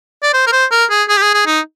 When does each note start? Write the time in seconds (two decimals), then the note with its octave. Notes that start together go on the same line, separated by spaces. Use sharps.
0.23 D5
0.34 C5
0.47 A#4
0.52 C5
0.71 A#4
0.90 G#4
1.09 G#4
1.17 G4
1.22 G#4
1.34 G#4
1.47 D#4